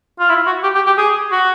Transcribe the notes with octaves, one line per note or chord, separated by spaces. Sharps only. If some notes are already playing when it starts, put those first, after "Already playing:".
F4
E4
F#4
G4
G4
G4
G#4
F#4